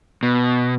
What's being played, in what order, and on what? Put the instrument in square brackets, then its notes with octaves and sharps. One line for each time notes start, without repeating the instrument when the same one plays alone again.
[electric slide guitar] B2